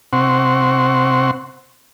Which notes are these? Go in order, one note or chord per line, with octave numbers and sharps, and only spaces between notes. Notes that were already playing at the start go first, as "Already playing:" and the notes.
C3 C4 F#5 C6 C#6